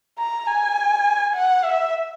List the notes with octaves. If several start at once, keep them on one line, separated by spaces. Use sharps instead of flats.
A#5
G#5
F#5
E5